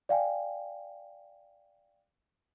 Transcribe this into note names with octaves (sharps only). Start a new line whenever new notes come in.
D5 F5 G5 G#5